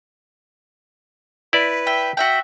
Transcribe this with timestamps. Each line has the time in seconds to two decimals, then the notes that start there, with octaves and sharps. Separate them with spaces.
1.53 E4 B4 D5
1.87 E5 G5
2.17 F#4 E5 G5